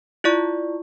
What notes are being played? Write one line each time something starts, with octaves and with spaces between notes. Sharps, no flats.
E4 F4 D5 C#6